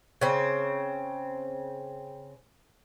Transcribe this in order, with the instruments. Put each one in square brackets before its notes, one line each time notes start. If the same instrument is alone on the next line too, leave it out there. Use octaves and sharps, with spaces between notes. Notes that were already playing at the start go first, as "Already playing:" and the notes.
[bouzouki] C#3 C4